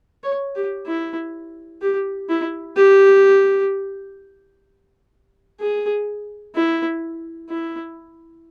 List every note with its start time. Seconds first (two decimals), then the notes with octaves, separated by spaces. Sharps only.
0.24 C#5
0.56 G4
0.87 E4
1.81 G4
2.29 E4
2.77 G4
5.60 G#4
6.55 E4
7.50 E4